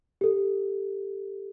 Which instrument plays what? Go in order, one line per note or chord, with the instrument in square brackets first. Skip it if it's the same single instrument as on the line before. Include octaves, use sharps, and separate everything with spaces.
[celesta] G4 A4